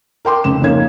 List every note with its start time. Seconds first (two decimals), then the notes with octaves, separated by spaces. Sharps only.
0.25 A#4 G5 C6 D6
0.44 F1 C#2 E7
0.62 F2 G#2 C#3 A#3 C#4 G#6